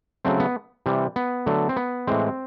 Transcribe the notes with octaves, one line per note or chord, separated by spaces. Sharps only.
C#3 F#3 A3 C4
B3
C3 E3 G3
B3
D3 F#3 A3
C4
B3
A2 E3 G#3 C4